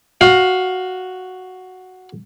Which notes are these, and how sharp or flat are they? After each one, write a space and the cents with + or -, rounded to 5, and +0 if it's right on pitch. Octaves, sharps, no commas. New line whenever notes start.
F#4 +0 F5 +15